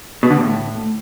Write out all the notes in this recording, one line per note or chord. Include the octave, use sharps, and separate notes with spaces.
B2
D3
A2